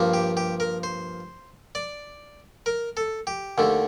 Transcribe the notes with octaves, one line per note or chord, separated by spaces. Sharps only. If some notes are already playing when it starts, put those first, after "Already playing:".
Already playing: G2 F3 A#3
G4
G4
A#4
C5
D5
A#4
A4
G4
D#2 D3 A3